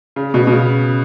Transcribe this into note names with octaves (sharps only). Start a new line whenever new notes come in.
C#3
B2
B2
C#3